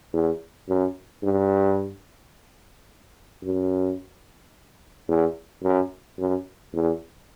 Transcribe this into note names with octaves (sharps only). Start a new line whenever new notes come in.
E2
F#2
G2
F#2
E2
F#2
F#2
E2